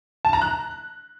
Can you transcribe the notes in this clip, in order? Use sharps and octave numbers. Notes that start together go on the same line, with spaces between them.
A5
A#5
F#6